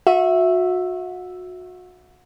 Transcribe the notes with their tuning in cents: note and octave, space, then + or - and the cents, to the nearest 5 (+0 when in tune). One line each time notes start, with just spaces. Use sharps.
F#4 -30 E5 +0